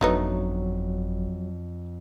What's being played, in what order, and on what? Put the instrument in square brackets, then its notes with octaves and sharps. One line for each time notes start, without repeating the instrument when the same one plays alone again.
[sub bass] G1 [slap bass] F2 D4 [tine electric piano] F#3 [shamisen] A3 B3 D#4